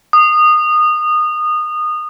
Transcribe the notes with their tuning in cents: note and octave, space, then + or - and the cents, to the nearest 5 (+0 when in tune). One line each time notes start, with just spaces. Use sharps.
D#6 -20